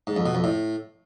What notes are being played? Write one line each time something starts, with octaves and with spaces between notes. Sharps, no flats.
G#2
F2
B2
F2
A2